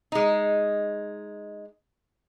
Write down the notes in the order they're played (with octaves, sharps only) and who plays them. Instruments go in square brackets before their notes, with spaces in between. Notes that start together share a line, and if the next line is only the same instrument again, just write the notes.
[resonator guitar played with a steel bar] G#3 D#4